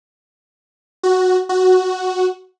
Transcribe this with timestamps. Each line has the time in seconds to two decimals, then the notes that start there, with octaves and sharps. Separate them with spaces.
1.03 F#4
1.49 F#4